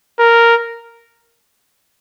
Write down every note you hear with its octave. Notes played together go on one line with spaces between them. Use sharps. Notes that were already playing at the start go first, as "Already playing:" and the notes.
A#4